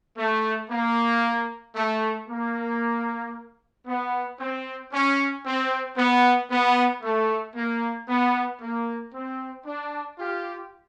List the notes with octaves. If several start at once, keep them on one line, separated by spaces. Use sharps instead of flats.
A3
A#3
A3
A#3
B3
C4
C#4
C4
B3
B3
A3
A#3
B3
A#3
C4
D4
F4 G4